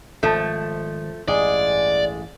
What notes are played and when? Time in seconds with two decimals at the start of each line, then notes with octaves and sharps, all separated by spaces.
0.23 G#1 F3 A3
1.28 A1 G2 G#3 D5